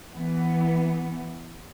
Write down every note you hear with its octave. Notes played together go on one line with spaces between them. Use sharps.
E3 B3